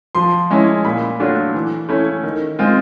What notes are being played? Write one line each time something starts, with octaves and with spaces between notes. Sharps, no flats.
F3 C6
G#3 C#4 E4
A#2 B5
F#3 A3 D4 F4
E3
A3 C#4 E4
D#3
G#3 C4 F4